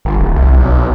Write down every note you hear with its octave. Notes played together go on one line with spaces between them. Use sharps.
G1
D1
C2
B1